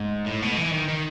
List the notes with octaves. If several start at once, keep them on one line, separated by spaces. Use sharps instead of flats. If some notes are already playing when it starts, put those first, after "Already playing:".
Already playing: G#2
A2
B2
E3
D#3
D#3